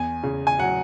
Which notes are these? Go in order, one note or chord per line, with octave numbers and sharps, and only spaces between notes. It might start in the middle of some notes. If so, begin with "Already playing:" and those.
Already playing: E2 G#5
C#3
G#5
F#3 F#5